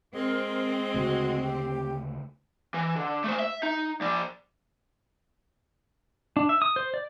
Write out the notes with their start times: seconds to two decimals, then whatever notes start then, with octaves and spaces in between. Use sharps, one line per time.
0.15 G#3 C4 A#4
0.94 D2 C#3 A3 F#4
1.42 G4
2.74 E3
2.96 D3
3.24 A3 C5
3.39 E5
3.63 D#4
4.01 F3 D5
6.37 D4
6.49 E5
6.62 D#6
6.76 C5
6.94 D5